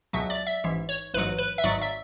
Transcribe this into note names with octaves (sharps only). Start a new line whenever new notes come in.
C#2 B2 F#3 E5
D5
E5
A1 G#2 E3
C#5
A1 G#2 F#3 B4
B4
E5
G#1 G#2 F#3 D5
E5